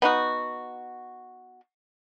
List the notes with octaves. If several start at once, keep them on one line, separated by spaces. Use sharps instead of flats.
B3 D#4 F#4